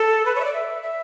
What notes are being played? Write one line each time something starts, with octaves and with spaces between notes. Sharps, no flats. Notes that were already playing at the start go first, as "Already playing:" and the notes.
Already playing: A4
B4
C#5
E5
D5
E5
E5